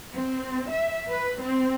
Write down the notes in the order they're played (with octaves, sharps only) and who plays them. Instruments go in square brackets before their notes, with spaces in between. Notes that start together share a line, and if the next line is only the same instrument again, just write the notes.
[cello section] C4
E5
B4
C4